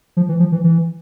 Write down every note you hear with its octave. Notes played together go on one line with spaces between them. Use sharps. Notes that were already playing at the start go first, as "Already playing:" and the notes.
F3
E3
F3
E3
E3